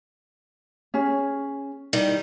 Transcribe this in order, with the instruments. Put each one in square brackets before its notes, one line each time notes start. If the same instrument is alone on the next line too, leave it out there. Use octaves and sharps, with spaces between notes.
[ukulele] C#4 G#4
[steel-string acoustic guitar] D#3 G3